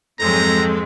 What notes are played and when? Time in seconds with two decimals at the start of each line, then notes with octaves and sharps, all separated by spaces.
0.19 F2 G#2 F#3 G#3 C4 A4 A#5